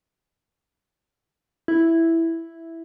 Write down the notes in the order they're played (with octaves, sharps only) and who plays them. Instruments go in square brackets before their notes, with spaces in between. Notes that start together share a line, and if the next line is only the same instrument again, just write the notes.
[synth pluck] E4